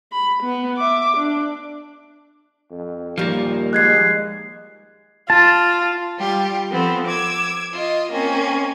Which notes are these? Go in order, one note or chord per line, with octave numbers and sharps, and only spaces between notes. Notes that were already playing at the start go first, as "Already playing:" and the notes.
B5
B3
E5 D6
D4
F2
D#2 A#2 F3 G3 A#3
G#3 F#6 G#6 C7
F4 A5
G3 F4 G4
F3 B3 C4 A4
D6 E6 G#6
F4 D#5
A#3 C4 C#4